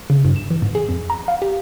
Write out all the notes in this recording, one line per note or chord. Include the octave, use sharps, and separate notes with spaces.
C#3
G2
E7
E3
G#2
G#4
F2
A#5
F5
G4